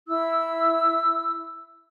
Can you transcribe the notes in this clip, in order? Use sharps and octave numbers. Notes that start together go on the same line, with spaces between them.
E4 E6